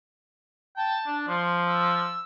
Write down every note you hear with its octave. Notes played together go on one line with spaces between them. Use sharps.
G5 A5
D4
F3 C6
E6